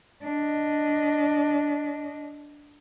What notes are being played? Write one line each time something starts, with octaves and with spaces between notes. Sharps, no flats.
D4 D#5